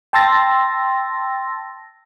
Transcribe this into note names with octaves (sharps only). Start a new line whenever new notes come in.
G5 A5 C6 E6 A6 A#6